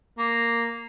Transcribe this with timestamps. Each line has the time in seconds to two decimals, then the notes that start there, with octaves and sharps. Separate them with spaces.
0.19 A#3